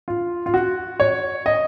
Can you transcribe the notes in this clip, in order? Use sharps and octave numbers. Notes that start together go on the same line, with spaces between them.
F4
F4
F#4
C#5
D#5